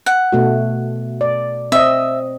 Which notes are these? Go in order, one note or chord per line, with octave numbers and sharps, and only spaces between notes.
F#5
B2 A3 F#4
D5
C4 D#5 E5